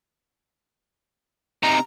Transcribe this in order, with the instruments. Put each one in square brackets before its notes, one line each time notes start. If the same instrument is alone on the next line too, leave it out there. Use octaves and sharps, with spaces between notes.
[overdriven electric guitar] C3 D#4 [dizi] A#5